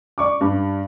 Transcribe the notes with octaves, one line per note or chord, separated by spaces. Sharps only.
D5 C#6 D6
G2